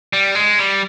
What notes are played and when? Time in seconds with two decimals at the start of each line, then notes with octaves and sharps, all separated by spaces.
0.13 G3
0.35 G#3
0.59 G3